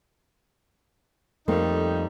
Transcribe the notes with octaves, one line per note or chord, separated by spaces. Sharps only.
F2 G3 A3 A#3 D#4